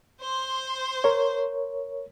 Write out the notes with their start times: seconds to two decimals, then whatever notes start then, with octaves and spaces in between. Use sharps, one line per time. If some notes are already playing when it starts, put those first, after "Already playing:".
0.21 C5 C6
1.04 A#4 C#5